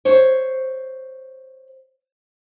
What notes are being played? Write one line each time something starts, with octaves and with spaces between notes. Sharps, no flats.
C5 C#5